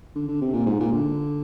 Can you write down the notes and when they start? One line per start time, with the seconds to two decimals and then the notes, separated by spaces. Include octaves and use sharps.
0.15 D3
0.28 D3
0.41 C3
0.54 A#2
0.66 G#2
0.80 A#2
0.92 D3